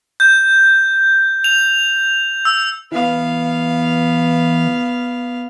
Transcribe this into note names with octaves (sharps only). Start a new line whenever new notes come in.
G6
F7
E6
E3 B3 F5